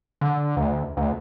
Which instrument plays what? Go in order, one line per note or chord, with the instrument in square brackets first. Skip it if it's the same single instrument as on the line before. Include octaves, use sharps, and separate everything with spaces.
[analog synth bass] D3
D2
D2